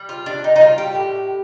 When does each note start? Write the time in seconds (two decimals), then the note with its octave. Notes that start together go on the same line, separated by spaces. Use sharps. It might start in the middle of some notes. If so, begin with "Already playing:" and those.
Already playing: G3
0.09 F4
0.26 C3 D4
0.44 D#4
0.56 D#4
0.61 G3 F4
0.78 G4
0.95 A2